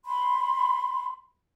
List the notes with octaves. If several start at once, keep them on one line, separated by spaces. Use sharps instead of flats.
B5 C6